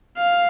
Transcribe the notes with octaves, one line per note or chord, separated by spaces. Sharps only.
F5